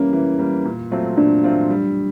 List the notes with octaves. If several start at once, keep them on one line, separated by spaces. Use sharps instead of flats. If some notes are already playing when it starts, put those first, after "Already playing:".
Already playing: E3 G3 A#3 C#4
E3
G3 A#3
A#2
F#3 A3 C4 F4
A#2 D4
F#3 A3 C4 F4
G3